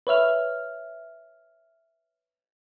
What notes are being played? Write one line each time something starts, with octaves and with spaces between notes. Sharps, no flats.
B4 C#5 E5 F6